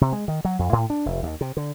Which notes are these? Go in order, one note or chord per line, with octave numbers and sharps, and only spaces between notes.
C3
G#3
D#3
F#3
F2
A2
D4
F1
D#2
C3
D3